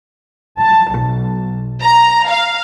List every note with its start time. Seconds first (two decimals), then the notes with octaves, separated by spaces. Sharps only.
0.61 A5
0.96 B1
1.83 A#5
2.29 F5